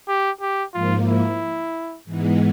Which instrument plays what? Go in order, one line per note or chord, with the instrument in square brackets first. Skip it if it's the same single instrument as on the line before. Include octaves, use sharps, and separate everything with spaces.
[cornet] G4
G4
[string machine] G#2 F3 A#3 [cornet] F4
[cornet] E4
[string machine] G#2 E3 G#3 B3